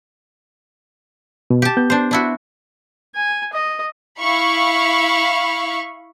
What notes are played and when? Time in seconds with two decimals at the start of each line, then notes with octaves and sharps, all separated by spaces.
1.50 B2
1.62 G4 A5
1.77 B3 G6
1.90 D4 C5
2.11 D4 E4 F#4
3.15 G#5
3.53 D#5
4.20 E4 F5 B5 C#6